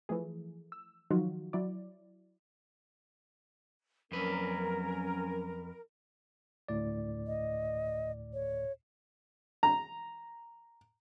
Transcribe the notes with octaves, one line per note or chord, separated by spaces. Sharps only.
E3 F3 A3 G#4
E6
D#3 F3 F#3 D#4 F4 F#4
F#3 E4 D5
F2 F#3 C#4 A#4 B4
D2 A2 D5
D#5
C#5
A#5